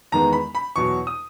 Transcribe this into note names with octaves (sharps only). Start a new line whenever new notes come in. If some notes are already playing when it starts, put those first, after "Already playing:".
E2 D#3 G#3 B3 A#5
B5
B5
E2 B2 F#3 C#6
D#6